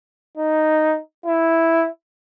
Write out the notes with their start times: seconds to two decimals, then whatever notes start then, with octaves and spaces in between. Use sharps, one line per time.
0.37 D#4
1.26 E4